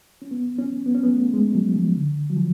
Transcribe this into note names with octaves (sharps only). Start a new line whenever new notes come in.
C#4
B3
C#4
B3
C#4
B3
A3
G#3
F#3
F3
D3
F#3
F3